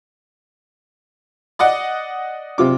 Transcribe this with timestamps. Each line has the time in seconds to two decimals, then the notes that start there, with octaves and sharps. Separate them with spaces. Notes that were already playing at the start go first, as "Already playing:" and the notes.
1.59 D5 D#5 F#5
2.58 C3 F4 D6